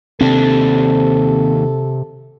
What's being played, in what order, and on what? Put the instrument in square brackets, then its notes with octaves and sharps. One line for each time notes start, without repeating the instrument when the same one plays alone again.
[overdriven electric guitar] D#2 D4 [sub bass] C3 [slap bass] C4 [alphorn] A4